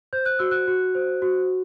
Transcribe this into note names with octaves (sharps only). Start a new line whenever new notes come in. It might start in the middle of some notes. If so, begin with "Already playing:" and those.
C5 G6
F#6
F#4 E6
F#6
F#4
C5
F#4